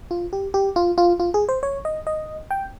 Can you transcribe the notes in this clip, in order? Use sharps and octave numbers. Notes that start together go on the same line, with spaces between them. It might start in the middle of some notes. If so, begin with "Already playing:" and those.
F4
G4
G4
F4
F4
F4
G#4
C5
C#5
D#5
D#5
G5